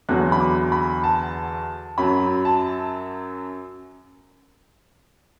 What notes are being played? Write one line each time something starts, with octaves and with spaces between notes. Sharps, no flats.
E2 D3 F#3 F#6
B5
D6
B5
A5
F#2 F#3 B5
A5